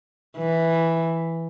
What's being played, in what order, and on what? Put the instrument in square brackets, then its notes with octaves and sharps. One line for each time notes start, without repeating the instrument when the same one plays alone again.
[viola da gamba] E3